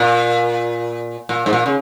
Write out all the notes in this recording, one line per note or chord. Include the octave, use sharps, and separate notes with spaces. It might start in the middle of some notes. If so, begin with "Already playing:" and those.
Already playing: A#2
A#2
G#2
A#2
C#3